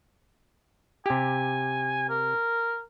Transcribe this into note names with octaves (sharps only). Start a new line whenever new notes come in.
C3 G4 G#5
A#4